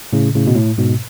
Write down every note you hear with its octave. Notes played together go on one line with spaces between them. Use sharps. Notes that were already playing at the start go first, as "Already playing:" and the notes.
A2 C#3
A2 C#3
B2
A2
G#2 B2